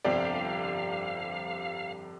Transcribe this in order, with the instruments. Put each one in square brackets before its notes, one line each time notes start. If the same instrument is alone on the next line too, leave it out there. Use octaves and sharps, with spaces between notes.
[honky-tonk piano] G1 F2 [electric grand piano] C3 G4 D5 [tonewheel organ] F5